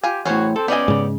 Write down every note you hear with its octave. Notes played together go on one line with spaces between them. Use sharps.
F4 G4 G#5
E2 A2 C#4 F#4 C5 C#5
C4 A4
B3 C#4 G4 D5 D#5 G#5
G#2 C#3